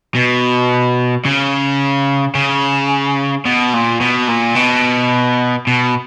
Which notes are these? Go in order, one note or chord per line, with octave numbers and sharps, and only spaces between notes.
B2
C#3
C#3
B2
A#2
B2
A#2
B2
B2